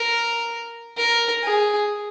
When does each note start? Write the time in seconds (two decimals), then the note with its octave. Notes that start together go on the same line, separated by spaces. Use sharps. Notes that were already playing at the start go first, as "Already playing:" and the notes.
Already playing: A#4
0.98 A#4
1.44 G#4